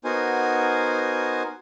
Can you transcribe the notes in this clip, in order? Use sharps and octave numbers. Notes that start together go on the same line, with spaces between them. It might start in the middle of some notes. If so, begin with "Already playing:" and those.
B3 D#4 F#4 A#4 C5 G#5